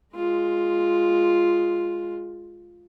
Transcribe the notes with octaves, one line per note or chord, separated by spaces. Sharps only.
G#3 F4